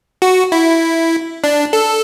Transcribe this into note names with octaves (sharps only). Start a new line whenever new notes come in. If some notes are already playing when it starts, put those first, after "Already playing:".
F#4
E4
D4
A4